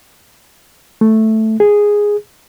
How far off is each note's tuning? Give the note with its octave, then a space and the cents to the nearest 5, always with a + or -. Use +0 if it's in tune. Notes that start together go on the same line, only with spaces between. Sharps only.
A3 +0
G#4 -5